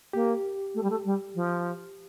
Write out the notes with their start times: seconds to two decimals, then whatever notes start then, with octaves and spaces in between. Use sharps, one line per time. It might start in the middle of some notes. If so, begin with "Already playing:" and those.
0.13 A#3 G4
0.74 A3
0.83 G3
0.90 A3
1.05 G3
1.35 F3